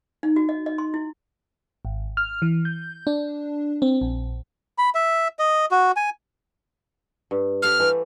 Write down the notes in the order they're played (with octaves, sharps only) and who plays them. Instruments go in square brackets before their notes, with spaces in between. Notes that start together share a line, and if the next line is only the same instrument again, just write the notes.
[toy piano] D#4
F#4
D#5
D#5
C6
E4
[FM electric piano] G#1
F6
E3
G6
D4
C4
A#1
[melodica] B5
E5
D#5
F#4
G#5
[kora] G2
[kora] G4 A4 C5 [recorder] F6
[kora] E3 A3 F5